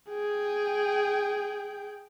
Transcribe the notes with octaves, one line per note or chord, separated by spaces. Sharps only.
G#4 G5